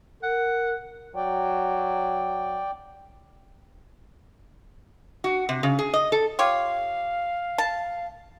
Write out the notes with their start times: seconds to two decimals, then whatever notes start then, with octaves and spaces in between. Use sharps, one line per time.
0.23 A#4 F#5
1.16 F#3 D5 G5
5.24 F#4
5.49 C3
5.63 C#3
5.79 G#4
5.94 D#5
6.12 A4
6.39 F4 G4 C#5 F5
7.58 A5